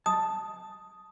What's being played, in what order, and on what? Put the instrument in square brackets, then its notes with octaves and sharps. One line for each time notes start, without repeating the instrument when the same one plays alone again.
[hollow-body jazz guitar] A5 [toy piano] D#6